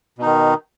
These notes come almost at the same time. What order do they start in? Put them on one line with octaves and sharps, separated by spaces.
B2 D#4 D#3